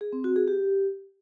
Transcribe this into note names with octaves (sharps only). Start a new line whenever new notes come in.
G#4
C4
F#4
G#4
G4